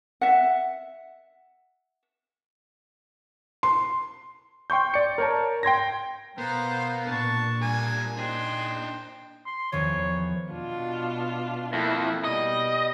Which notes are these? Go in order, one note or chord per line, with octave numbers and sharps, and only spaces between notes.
E5 F#5
C6
G5 C6 C#6 G6
D5 C#7
A#4 C#5 A5
G5 C6 G#6 A#6
B2 B3 A#4 C5 F5
A#2 D4 A5 C#6
G3 D4 A#4 G#5
D4 D#4 G#4 C5 G5
C6
E2 D#3 F3 C#5
B2 D4 F4
F2 A#3 E4
B2 G3 D#5